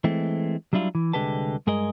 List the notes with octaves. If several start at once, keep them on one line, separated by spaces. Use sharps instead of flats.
E3 G#3 A3 C4
F#3 G3 D4 E4 F4
E3
C2 D3 G#3 G4 B4 A5
G2 G#3 G#4 A#4 D#5